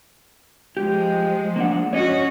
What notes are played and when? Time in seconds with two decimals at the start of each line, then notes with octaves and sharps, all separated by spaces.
0.77 F3 G#3 G4
1.56 A#3 D4 F#5
1.93 C#4 F#4 C#5 D#5